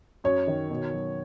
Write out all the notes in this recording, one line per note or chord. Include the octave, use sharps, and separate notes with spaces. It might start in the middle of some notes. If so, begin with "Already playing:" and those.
F#2 C#5
D#3
B2
F#3